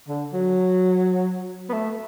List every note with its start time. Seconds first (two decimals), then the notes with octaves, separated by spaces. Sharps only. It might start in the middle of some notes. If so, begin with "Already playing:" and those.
0.09 D3
0.33 F#3
1.69 B3
1.73 A3